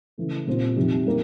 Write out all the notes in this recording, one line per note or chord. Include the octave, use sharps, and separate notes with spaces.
C#3 E3 A3
A#2 G3 C4 F4
F2 C3 D#3 G3
D#3 G3 A#3